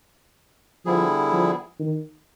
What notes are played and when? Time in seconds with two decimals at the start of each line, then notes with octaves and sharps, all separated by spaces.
0.86 D3 F3 G3 B3 E4 G#4
1.32 F3
1.80 D#3